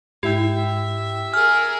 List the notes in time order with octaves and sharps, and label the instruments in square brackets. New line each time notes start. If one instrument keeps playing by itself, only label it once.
[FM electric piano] G#2 E4 G5 [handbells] G4 [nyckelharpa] E5
[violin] G#4 A#4 [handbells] F6